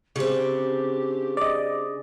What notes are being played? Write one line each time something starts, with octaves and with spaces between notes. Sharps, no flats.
C#3 C4 D4 G4
D5 D#5